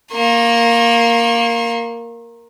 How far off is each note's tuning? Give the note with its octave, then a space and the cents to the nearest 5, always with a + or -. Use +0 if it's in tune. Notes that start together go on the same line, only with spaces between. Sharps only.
A#3 +0 C#6 -45